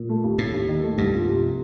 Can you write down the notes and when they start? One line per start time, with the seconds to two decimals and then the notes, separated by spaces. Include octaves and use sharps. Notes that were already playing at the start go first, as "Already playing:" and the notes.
Already playing: A#2
0.09 A3
0.23 D#2
0.38 D#2 A2
0.53 D#2
0.69 D#3
0.83 A3
0.98 C2 G2
1.12 F3
1.28 C3